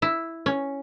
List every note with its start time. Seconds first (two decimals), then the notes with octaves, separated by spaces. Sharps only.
0.02 E4
0.46 C#4